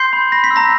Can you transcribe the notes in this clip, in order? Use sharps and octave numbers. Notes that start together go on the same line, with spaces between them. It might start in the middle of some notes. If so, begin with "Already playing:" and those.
Already playing: C6 G6 C7
B5
B5 A#6
B6
E6
A#5 A#6